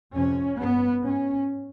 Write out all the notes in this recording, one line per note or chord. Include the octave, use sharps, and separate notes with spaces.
F2 C3 C#4
G2 B3
G#2 C#4